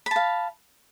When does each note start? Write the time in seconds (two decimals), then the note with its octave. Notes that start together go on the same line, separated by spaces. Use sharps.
0.06 B5
0.11 A5
0.16 F5